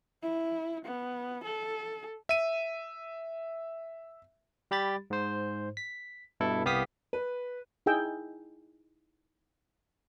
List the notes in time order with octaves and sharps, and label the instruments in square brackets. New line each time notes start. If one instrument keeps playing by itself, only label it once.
[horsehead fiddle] E4
B3
A4
[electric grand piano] E5 D#7
[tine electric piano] G3 G4 B5 A6
G#2 C5
B6
G2 B2 E4 A4
C2 B3 G4 F5 D#6 B6
[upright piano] B4
[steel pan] D#4 E4 G#4 G5 E6